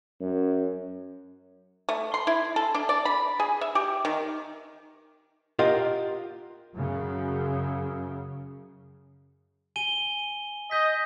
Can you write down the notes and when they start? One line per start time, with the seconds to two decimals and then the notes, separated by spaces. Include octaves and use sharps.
0.21 F#2
1.89 A3
2.14 C6
2.27 E4
2.56 A4
2.74 D4
2.89 D5
3.05 B5
3.40 G#4
3.61 E5
3.75 G4
4.05 D#3
5.59 F4 G4 A#4 D#5 F5 F#5
6.74 F#2 C#3
9.76 G#5 D#7 G7
10.71 D#5 G6 B6